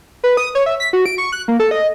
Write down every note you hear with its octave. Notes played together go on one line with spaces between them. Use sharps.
B4
D#6
C#5
E5
B6
F#4
D7
C#6
F#6
A#3
A4
D#5